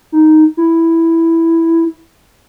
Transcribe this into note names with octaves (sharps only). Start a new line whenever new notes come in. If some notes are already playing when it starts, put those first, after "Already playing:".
D#4
E4